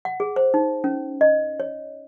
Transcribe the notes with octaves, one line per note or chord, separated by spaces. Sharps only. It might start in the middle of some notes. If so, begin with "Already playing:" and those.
F#5
G#4
C5
D#4
C#4
D#5
C#5